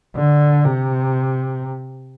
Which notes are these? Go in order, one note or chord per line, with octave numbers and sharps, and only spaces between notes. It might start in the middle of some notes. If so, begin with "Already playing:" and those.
D3
C3